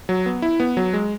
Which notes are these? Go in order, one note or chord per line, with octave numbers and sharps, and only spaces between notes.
F#3
B3
E4
B3
F#3
G#3